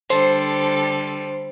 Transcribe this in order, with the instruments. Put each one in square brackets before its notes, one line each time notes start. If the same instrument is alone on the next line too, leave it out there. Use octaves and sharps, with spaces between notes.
[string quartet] D3 G3 A4 [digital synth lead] C5